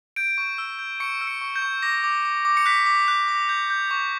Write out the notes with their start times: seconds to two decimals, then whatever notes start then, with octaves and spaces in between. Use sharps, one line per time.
0.16 G6 D7
0.38 C#6
0.58 E6
0.79 G6
1.00 C#6 C#7
1.21 E6
1.27 C#7
1.41 C#6
1.56 G6
1.62 C#6
1.82 D6 A#6
2.04 D6
2.25 D6
2.45 D6
2.57 C#7
2.66 F#6 B6
2.86 D6
3.08 F#6
3.28 D6
3.49 G6
3.70 G6
3.91 C#6